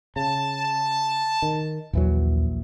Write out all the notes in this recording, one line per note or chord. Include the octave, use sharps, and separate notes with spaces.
C#3 A5
D#3
A#1 D#2 E3 F#3